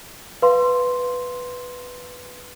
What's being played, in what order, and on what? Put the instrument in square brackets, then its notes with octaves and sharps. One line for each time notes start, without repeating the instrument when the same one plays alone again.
[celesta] B4 F5 C6